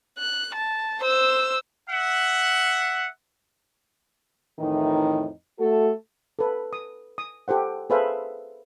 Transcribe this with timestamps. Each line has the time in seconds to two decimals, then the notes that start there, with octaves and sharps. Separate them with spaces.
0.19 F#6
0.55 A5
1.01 C5 E6
1.89 E5 F#5
4.59 F2 A2 D#3 E3 D#4
5.59 A3 F#4 A4
6.39 A4 B4
6.73 D#6
7.18 D#6
7.48 G4 A4 C5 F#5
7.90 G#4 A4 B4 C5 E5 F5